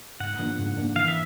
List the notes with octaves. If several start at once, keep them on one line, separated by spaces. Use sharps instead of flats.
G#2 F#5
F3 A#3 D4
G#2
F3 A#3 D4
E3 F5
E5